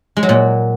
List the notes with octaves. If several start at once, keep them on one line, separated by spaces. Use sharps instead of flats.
G#3
F#3
A#2